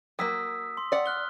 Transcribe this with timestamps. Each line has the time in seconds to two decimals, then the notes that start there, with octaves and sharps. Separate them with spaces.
0.19 F#3 A#3 D#6 E6 B6
0.77 C6
0.92 D5 F#5
1.06 F6 F#6 G7